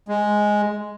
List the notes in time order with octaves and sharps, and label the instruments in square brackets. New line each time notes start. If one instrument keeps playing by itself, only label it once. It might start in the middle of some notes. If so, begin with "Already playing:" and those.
[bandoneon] G#3